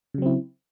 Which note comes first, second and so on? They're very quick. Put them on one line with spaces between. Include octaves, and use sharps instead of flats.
C#3 F#3 C4 E4